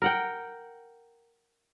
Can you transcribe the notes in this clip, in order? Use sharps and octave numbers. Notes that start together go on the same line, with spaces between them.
A#4 F#5 G5